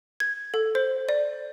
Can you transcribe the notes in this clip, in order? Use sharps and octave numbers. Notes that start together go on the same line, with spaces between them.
G#6
A4
C5
D5